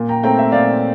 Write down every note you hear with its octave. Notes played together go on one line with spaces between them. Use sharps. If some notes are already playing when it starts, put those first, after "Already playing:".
Already playing: A#2
G5 A#5
A3 C4 G5 A#5
E5
A#2 D5 F5